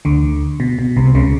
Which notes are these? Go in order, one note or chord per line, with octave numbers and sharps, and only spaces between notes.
D2 D3
B2
B2
C2 C3
C#2 C#3